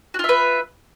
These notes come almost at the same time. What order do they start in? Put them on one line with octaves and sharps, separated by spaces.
F#4 F4 E5 B4